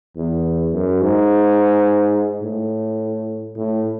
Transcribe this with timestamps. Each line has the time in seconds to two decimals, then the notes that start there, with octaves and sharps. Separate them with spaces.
0.17 E2
0.73 F#2
1.01 G#2
2.43 A2
3.56 A2